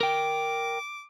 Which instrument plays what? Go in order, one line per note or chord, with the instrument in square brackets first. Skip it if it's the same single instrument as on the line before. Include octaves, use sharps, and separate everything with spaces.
[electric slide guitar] A#4 G5 [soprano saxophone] D6